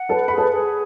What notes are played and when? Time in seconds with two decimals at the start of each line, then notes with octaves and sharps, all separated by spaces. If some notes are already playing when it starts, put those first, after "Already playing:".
Already playing: F#5
0.09 A4 B4 A5
0.28 G#4 B5
0.38 A4 A5
0.51 G#4